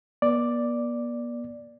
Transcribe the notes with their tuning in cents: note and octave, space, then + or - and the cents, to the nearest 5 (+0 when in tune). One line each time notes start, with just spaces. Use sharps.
B3 -45 D5 +0